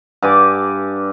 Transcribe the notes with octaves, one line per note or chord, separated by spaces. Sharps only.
G2 D5 G#5 D6